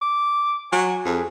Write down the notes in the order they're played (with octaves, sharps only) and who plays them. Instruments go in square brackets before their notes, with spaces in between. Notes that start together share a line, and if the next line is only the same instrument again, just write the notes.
[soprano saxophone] D6
[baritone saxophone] F#3 [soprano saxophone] G#5
[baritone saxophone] F2 [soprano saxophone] G#4